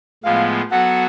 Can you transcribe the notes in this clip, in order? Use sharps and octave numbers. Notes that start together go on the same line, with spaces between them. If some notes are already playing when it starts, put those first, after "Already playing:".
A2 F3 G#3 B3 F5
F#3 B3 F#4 A4 F#5